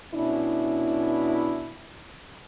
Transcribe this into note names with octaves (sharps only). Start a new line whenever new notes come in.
B2 C#4 D4 E4